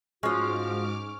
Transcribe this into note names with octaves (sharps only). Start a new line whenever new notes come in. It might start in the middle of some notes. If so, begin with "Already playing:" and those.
G#2 F3 G#3 C#4 F#4 D6 F6